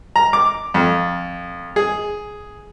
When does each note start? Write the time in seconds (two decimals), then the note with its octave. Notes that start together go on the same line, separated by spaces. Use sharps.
0.16 A#5
0.33 D6
0.74 F2
1.76 G#4